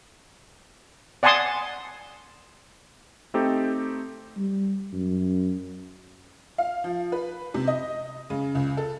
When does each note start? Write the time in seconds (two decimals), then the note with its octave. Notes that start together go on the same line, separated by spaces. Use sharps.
1.23 D5 F#5 G#5 A5 C6 D#6
3.34 A3 C4 D#4 G4 A4
4.37 G3
4.93 F#2
6.58 F5
6.84 F3
7.12 B4
7.54 C3
7.67 D#5
8.30 C#3
8.55 C#2
8.77 A4